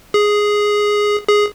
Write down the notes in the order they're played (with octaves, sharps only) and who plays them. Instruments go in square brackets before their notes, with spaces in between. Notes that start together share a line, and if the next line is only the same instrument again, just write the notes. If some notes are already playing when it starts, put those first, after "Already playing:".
[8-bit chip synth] G#4
G#4